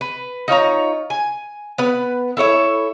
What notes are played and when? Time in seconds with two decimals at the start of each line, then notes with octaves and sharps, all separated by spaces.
0.01 B4
0.48 D#4 F4 C#5 A#5
1.10 G#5
1.78 B3 B4
2.37 E4 A4 C#5 E5